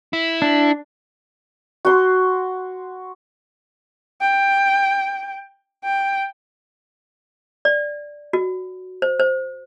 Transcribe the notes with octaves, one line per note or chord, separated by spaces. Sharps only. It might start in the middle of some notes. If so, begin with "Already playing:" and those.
E4
D4
F#4 C6
G5
G5
D5
F#4
C5
C5